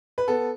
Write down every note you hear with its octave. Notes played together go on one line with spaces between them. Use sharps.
B4
B3 A4